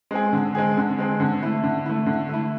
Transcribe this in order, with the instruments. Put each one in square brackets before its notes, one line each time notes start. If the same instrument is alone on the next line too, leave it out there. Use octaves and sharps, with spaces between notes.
[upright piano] G#3 C4 G#4
D3
G#3 C4 G#4
D3
G#3 C4 G#4
D3
A3 E4
D3
A3 E4
D3
A3 E4